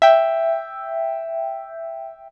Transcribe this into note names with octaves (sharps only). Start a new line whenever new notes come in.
E5 G5